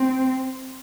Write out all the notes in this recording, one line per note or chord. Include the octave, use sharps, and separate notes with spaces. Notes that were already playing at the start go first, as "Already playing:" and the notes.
Already playing: C4